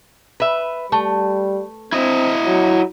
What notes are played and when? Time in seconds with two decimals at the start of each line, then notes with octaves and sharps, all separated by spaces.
0.40 B4 E5
0.92 G3 A3
1.92 C4 E4 D#5
2.46 F#3